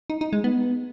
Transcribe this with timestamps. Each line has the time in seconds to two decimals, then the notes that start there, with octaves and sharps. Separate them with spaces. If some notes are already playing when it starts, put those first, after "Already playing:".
0.10 D#4
0.21 D#4
0.33 G#3
0.44 B3